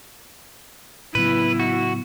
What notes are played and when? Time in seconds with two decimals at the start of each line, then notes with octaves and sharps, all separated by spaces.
1.15 A2 C#3 F#3 B3 E4 B4
1.60 F#4